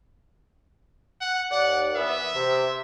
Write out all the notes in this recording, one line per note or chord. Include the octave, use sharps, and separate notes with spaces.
F#5
D#2 D5 F#5
E3 B3 E5
C3